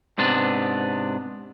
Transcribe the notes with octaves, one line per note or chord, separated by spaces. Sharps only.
G#2 C3 B3 D4